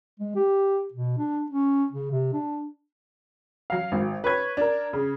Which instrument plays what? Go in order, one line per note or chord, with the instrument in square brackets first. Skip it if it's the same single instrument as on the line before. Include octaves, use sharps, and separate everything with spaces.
[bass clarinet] G#3
G4
B2
D4
C#4
C#3
C3
D4
[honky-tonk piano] F#3 F5
G#1
B4 C#5 G#6
D4 A#4
C#3